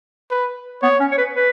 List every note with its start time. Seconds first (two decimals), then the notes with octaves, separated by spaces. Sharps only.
0.31 B4
0.82 B3 C#5
1.00 C#4
1.11 C#5
1.18 B4
1.35 B4